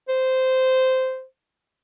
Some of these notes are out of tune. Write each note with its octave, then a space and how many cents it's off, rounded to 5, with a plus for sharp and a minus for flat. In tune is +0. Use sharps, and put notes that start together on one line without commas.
C5 -10